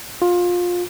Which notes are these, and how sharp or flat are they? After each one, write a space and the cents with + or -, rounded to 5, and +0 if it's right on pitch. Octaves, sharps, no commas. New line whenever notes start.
F4 +20